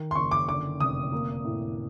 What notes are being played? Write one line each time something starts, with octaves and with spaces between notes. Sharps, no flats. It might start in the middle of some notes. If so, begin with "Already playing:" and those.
Already playing: D#3
C6
F#1 C#6
D6
D3 D6
F1 D#6
A#3
A2